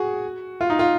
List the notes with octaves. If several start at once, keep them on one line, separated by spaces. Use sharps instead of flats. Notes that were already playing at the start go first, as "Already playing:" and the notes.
Already playing: F#4 G#4
F4
D#4
F4